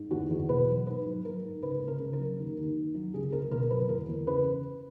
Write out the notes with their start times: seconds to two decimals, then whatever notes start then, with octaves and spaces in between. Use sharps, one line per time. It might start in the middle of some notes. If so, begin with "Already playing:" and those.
Already playing: G#2
0.11 E2 F#4
0.30 E2
0.49 B2 B4
0.68 F#3
0.87 G#2 B4
1.06 F#3
1.25 F#3 A#4
1.44 G#2
1.62 C#2 B4
1.82 C#2
1.88 A#4
2.00 C#3
2.13 A#4
2.19 F#3
2.38 D#2
2.57 D#2
2.76 D#3
2.94 F#3
3.14 C#2 G#4
3.32 C#2 A#4
3.51 B2 A#4
3.70 F#3 B4
3.89 E2 A#4
4.09 E2
4.27 C#3 B4